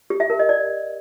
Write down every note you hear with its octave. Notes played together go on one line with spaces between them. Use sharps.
G4
E5
A#4
D#5
D5